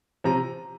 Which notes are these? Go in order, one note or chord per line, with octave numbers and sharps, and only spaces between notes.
C3 F3 A#5